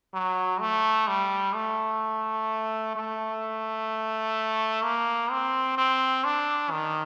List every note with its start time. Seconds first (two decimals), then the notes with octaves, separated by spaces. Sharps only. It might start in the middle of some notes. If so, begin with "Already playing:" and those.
0.14 F#3
0.60 A3
1.08 G3
1.55 A3
2.96 A3
4.84 A#3
5.31 C4
5.78 C4
6.24 D4
6.71 D#3